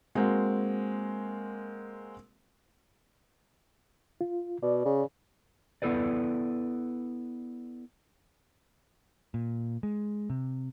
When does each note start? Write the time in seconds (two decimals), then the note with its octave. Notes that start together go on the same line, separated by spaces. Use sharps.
0.15 G#3 A#3 C4 F#4
4.21 F4
4.63 B2 D5
4.85 C#3
5.82 B3 E4 A4 B4 D5
9.34 A#2
9.83 G#3
10.30 C3